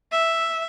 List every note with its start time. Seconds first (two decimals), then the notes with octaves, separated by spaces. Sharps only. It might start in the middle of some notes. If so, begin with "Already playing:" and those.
0.12 E5